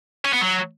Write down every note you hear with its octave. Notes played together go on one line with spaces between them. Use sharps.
C#4
B3
F#3